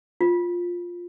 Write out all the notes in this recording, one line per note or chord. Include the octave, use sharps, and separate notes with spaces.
F4